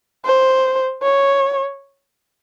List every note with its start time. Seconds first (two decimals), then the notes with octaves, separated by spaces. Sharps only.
0.25 C5
1.03 C#5